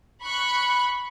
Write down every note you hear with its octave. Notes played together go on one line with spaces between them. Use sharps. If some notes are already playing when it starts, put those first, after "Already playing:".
B5 C#6 F#6